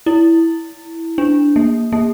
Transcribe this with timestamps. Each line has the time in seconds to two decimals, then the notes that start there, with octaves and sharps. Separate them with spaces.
0.06 E4
1.18 D4
1.56 A#3
1.92 A#3